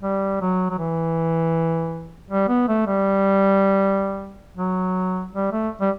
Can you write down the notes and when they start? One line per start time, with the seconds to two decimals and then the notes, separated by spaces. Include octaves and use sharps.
0.03 G3
0.41 F#3
0.70 F#3
0.78 E3
2.30 G3
2.48 B3
2.68 A3
2.87 G3
4.57 F#3
5.34 G3
5.52 A3
5.81 G3